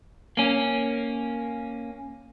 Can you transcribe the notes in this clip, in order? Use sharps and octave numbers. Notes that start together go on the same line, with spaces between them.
A#3 C#4